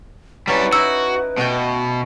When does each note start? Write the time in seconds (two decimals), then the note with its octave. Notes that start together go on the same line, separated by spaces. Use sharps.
0.47 F#3 G3 C#4 E4 B4 A5
0.73 D#4 E4 F#4 E6
1.38 B2 A3 F#4 G5